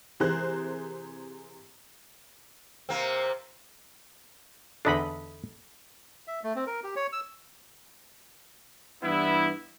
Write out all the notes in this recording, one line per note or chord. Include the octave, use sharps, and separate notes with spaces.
C3 E3 G#4 A#4 C5 F#6
C3 A#3 C4
E2 D3 D4 A4 D#5 B5
E5
A3
C4
A#4
G4
C#5
E6
G2 E3 G3 B3 E4